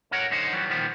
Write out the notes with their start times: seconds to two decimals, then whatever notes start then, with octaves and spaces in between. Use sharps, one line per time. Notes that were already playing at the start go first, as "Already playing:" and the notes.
0.11 A2 C#4 F#4 A#4 C#5 F#5
0.30 F#2 D3 D#4 C5 F#5
0.52 E3 F#3 G3 B3
0.70 A#2 D#3 F3 G3 B3